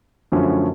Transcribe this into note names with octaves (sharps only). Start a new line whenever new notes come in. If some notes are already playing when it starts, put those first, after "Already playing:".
F#2 D3 F3 A3 C#4